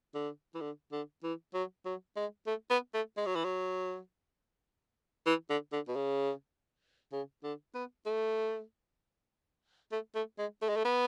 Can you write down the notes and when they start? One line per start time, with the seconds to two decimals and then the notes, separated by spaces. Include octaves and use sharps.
0.15 D3
0.55 E3
0.61 D3
0.92 D3
1.24 E3
1.54 F#3
1.86 F#3
2.16 G#3
2.47 A3
2.70 B3
2.94 A3
3.17 G#3
3.26 F#3
3.35 E3
3.44 F#3
5.27 E3
5.50 D3
5.73 D3
5.88 B2
5.96 C#3
7.13 C#3
7.44 D3
7.74 B3
8.06 A3
9.92 A3
10.15 A3
10.39 G#3
10.62 A3
10.69 G#3
10.76 A3
10.85 B3